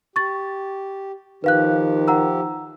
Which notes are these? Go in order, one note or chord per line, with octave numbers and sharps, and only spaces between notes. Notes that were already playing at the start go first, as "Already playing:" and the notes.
G4 C#6 A6
D#3 F3 G4 B4 F5 F#6
F#5 A#5 E6